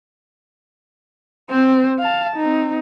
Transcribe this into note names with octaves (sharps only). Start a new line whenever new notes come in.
C4 C5
F5 A5
C4 D#4